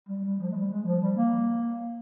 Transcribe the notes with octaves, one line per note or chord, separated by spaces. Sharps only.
G3
G3
F3
G#3
G3
G#3
F3
G3
A#3